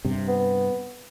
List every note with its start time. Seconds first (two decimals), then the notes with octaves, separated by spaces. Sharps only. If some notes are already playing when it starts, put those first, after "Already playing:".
0.05 G2 C3
0.28 B3